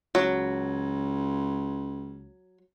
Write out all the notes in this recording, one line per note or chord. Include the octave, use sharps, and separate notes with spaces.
C#2 F#3